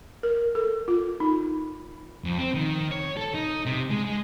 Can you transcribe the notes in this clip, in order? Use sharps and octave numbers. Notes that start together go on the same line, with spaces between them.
A#4
A4
F4
D#4
F2
C4
D#3
C#5
A4
D#4
C3
G#3
G#3